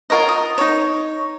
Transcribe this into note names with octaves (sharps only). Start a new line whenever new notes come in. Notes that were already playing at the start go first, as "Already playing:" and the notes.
F4 A#4 C#5 D#5
D#6
D#4 C#5